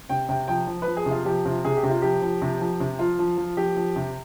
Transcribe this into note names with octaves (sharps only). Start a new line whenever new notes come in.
C3 G5
C3 G5
F3 G5
F3
B4
F3
G#4
C3
F4
F3 G4
C3 F4
C3 G#4
G4
C3
F4
F3 G4
F3
C3
F3
C3
F3 F4
F3
F3
F3 G4
F3
C3